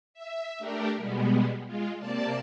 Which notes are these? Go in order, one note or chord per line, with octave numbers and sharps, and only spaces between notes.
E5
A3 D4 G4 A#4
B2 G3 G#3 B3
G#3 F4
C3 A#3 D5 A5